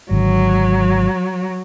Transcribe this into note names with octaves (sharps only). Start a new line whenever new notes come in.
G#1 D3 F#3